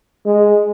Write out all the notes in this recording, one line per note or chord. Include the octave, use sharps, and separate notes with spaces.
G#3